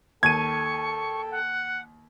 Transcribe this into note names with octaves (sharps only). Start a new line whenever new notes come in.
D#2 A4 G5 A5 C#6 G#6 D#7
F#5